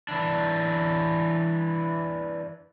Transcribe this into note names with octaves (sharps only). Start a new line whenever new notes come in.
E3 D4